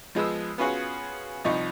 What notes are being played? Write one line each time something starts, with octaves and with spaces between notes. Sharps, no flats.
F3 G#3 B3 D#6 E6
B3 C#4 F4 F#4 G#4
C2 F3 D#4 C#6